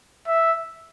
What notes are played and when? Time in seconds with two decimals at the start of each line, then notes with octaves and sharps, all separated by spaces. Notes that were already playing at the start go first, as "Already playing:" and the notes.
0.27 E5